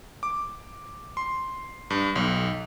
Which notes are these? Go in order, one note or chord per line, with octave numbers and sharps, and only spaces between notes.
D6
C6
G2
B1